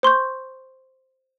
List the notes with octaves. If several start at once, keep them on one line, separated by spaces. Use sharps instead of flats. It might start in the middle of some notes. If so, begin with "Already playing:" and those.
C5 C6 C#6 G6